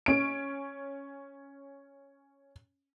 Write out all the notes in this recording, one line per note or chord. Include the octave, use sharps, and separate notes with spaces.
C#4 D7